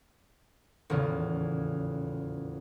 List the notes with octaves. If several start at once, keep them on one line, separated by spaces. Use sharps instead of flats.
D#1 E2 A2 C#3 B3